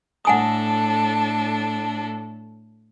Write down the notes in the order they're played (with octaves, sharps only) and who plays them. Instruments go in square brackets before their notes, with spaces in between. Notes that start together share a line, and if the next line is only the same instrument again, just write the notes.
[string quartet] A2 D4 A4 [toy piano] F#5 G#5 D#6